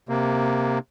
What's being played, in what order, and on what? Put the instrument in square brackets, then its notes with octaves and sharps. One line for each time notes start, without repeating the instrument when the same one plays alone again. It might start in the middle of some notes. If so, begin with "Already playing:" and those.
[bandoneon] C3 A#3